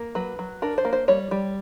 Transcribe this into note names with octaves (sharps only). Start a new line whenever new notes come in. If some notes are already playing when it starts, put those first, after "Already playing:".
Already playing: A#3
F#3 B4
F#3
D4 A#4
C5
A#3
C5
G3 C#5
G3